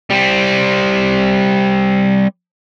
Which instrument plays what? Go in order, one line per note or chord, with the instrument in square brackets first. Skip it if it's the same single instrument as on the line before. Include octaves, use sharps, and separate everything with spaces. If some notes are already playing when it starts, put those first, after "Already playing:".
[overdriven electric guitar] G3 C4